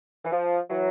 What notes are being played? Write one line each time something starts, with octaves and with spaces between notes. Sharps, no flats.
E3
F3
E3 F#3